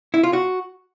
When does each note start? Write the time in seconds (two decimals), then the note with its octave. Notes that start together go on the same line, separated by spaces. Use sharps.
0.14 E4
0.24 F4
0.33 F#4